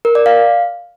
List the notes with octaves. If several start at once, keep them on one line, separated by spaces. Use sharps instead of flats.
A#4
D5
F5